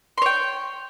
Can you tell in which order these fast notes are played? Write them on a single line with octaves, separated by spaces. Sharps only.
C6 C#5 G5